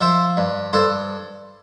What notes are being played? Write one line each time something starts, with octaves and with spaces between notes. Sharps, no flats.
F3 C5 E5
G2
G2 A4 C5